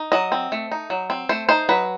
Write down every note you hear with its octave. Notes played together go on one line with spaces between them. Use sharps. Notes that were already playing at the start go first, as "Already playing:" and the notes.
Already playing: D#4
F#3 D#5
C4
A3
D#4
F#3
C4
A3 C5
D#4 C5
F#3 B4